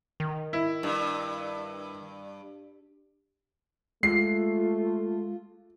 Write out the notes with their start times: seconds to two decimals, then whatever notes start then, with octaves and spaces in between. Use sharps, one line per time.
0.20 D#3
0.53 E4
0.83 G2
4.03 G#3 A3 F4 C7